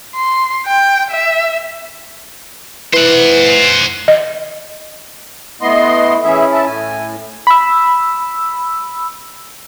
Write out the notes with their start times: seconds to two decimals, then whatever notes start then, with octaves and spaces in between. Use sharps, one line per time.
0.15 C6
0.66 G5
1.11 E5
2.93 E3 C5 F#5
4.08 D#5
5.62 A3 B3 E4 D#5 C6
6.24 E3 C#4 E4 G#4 E5
6.52 E5 A5
6.66 A2 G#5
7.47 B5 E6